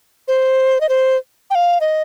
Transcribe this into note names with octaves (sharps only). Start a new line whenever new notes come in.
C5
D#5
C5
G5
F5
D#5